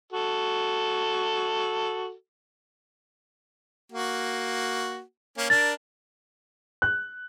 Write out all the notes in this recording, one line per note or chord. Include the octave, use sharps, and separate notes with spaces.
F#4 A4
A#3 F#4
A#3 C#4
D4 A#4 A6
F#6